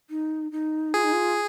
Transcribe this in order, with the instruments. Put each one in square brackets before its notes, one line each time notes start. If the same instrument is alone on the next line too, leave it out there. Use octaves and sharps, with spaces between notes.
[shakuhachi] D#4
D#4
[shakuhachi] F4 [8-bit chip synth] G#4
[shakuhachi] D#4
F4